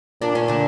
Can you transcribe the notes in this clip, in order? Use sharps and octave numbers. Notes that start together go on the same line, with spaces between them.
A#2 D4
C#4
D3 D4